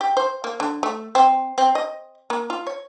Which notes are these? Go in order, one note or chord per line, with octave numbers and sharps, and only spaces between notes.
G4
C5
A#3
D3
A3
C4
C4
D#5
A#3
F4
C#5